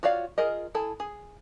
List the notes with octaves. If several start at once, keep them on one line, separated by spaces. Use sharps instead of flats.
F4 F#4 C#5 D5 F5
F4 G#4 A#4 D#5
E4 G#4 A4 A5
G#4